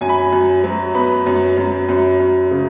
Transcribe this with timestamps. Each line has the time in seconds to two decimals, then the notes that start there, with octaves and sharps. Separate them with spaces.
0.01 F#2 G#5
0.09 B5
0.18 G#5
0.32 F#2
0.64 F#3
0.95 B3 B5
1.26 F#2
1.57 F#2
1.89 F#2
2.20 F#2
2.51 C#3